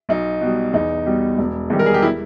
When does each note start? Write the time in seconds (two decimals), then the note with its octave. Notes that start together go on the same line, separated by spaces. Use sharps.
0.09 B1 D#4
0.41 B2 G3
0.73 E2 D#4
1.06 B2 G3
1.38 E1
1.70 E2 D#3 G3
1.79 A#4
1.86 G#4
1.94 G4
2.02 E4